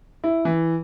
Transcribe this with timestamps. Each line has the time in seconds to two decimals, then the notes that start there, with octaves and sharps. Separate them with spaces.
0.24 E4
0.45 E3